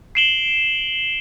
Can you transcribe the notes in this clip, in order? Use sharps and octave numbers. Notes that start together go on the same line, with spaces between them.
C7 D7 E7 F#7 G7